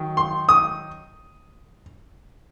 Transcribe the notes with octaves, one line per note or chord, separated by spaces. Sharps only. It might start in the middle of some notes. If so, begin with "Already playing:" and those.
Already playing: D#3 F#3
C6
D#6